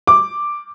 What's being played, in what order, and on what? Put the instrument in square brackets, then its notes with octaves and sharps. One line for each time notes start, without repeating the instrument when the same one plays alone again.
[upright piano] D6